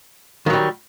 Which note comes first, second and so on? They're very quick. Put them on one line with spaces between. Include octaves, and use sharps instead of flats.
D#3 F#3 G3